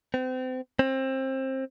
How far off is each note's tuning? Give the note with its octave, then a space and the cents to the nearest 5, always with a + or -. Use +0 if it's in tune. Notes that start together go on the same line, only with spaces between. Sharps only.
C4 -35
C4 +25